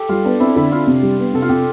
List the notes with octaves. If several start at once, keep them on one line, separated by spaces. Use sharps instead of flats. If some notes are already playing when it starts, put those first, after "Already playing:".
Already playing: G4 A4
G3 F4
B3 D4
C4 E4
D3 E4
C4 F4
C3
G3
B3
C3 A4
F4
C3 G4